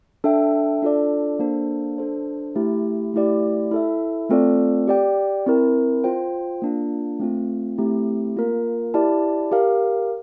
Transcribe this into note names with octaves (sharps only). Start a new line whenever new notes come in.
D4 A4 E5 G5
D4 F4 A4 D5
A#3 D4 A4 C5
D4 A4 C5
A3 E4 G4
A3 E4 G4 D5
E4 A4 E5
A3 C4 F4 A4 D5
G4 D5 G5
C4 E4 A#4
F4 C5 G5
A#3 D4 F4
A3 C4 F4
A3 C4 E4 G4
A#3 F4 A#4
E4 G4 D5 A5
G4 A#4 F5